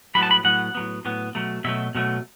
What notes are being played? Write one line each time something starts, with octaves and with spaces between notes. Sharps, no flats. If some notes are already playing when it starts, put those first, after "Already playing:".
A2 F#3 B3 B5
A5
B5
A2 F#3 B3 F#5
A2 F#3 B3
A2 F#3 B3
B2 F#3 A3
B2 F#3 A3 E5
B2 F#3 A3